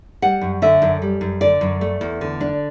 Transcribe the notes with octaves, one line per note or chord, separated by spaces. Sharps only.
G3 F#5
F#2
D3 E5
F#2
G3
F#2
D3 D5
F#2
A3
E2
D3
D4